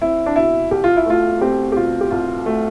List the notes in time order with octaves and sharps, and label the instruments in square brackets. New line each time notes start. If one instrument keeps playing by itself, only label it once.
[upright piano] C4 [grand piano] E4
[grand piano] D4
[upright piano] B2 [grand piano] E4
[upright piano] C2 [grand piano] G4
[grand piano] F4
E4
[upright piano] A3 [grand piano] F4
[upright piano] C4 [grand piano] G4
[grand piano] G4
[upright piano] B2 [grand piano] F4
[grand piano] G4
[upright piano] C2 [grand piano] F4
[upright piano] A3